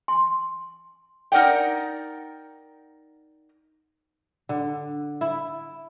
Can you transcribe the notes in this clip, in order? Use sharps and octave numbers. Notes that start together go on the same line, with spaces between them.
C6
D#4 A#4 D5 F#5 G5
D3
E4